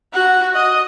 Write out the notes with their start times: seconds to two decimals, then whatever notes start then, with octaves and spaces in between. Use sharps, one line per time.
0.13 F#4 F#5
0.55 D#5